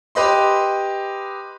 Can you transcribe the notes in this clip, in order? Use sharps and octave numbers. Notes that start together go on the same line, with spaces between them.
G4 B4 D#5 C6